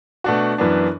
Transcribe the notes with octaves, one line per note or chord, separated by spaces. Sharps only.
B2 A3 D4 F#4
F#2 E3 B3 D4